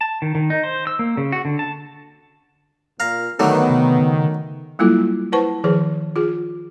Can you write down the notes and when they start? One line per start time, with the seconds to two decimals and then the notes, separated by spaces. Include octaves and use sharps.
0.01 A5
0.22 D#3
0.35 D#3
0.50 D#4
0.63 C5
0.87 E6
0.99 A#3
1.17 C#3
1.32 F#4
1.45 D3
1.59 A5
3.00 A#2 F5 A#5
3.40 D3 D#3 F#3 A3 B3
3.70 C3
3.99 C#3
4.79 F#3 G3 A#3 E4 F4 A4
5.32 E4 B4 C5 F#5 A5 C#6
5.64 D#3 F3 G#4 B4 C5
6.16 F4 G#4